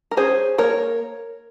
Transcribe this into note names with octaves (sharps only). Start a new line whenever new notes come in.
A#4
C#4 G#4 C5
A#3 A#4 C#5